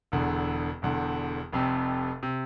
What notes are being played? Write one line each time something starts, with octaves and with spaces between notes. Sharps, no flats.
E1 E2 D3
E1 E2 D3
F1 F2 C3
C3